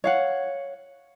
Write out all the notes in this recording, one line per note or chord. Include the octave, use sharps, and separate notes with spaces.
C#5 F5 F#5